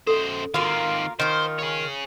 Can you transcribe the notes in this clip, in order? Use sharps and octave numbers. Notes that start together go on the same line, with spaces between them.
F#2 A4 C5
D#3 A#3 C4 F4 F#4
D#3 F4 C5
G#4 C#5